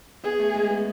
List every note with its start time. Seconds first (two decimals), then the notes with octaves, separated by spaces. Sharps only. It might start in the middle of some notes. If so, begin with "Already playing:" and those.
0.24 B3 G#4
0.40 A3
0.55 G#3
0.70 B3